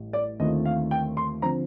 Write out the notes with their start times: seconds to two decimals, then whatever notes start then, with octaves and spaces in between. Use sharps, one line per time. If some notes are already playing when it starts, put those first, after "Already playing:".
Already playing: A1 A2 G3
0.13 D5
0.40 D#2 D3 A3 C4 F4 D#5
0.65 F5
0.91 G5
1.17 C6
1.42 D3 F3 C4 A#5